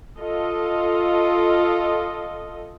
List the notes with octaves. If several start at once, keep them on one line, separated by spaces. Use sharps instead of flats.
F4 A4 D#5